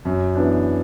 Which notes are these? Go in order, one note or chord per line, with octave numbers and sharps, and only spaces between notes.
F#2
E3 B3 D4